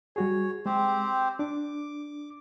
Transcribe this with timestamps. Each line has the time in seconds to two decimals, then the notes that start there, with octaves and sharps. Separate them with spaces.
0.16 G3 F#4 G#4 C#5
0.66 G#3 C4 G4 C5
1.39 D4 D6